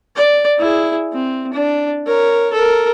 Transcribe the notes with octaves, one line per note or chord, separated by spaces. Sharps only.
D5
E4 G#4
C4
D4
A#4 C#5
A4 A#4